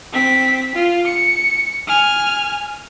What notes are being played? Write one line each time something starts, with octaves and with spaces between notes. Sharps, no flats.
C4 B6
F4
C#7
G#5 F6